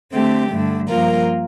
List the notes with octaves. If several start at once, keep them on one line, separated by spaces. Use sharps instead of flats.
D3 A3 C4 G4
G2 D3 A3
G2 F3 A#3 F4 A#4